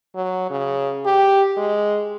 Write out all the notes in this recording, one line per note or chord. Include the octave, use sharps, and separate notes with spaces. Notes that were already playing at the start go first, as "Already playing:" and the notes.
F#3
C#3
G4
G#3